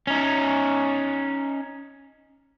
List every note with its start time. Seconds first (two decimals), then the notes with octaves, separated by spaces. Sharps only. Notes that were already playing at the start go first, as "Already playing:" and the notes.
0.07 C#4 D#4